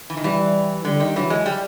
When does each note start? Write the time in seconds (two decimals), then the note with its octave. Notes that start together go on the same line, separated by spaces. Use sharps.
0.10 E3
0.17 D#3
0.24 E3 G3
0.85 D3 G3
1.00 D#3
1.16 E3 F#3
1.30 G#3
1.46 G3